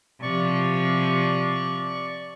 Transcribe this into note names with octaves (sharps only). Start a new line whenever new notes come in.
C3 F3 D5 C#6